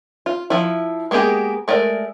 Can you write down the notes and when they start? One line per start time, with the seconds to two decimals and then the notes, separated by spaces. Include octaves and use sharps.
0.26 F4
0.50 F3 E4
1.11 G#3 A#3 B3 G4 G#4
1.68 G#3 A3 A#4 D5